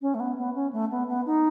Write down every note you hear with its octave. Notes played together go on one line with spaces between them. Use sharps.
C#4
A3
B3
B3
C#4
A3
B3
B3
D#4